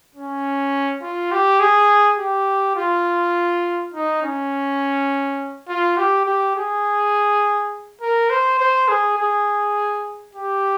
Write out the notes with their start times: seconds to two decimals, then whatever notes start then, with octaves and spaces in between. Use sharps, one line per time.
0.15 C#4
1.02 F4
1.32 G4
1.60 G#4
2.19 G4
2.76 F4
3.94 D#4
4.23 C#4
5.68 F4
5.97 G4
6.26 G4
6.56 G#4
8.01 A#4
8.30 C5
8.60 C5
8.88 G#4
9.18 G#4
10.35 G4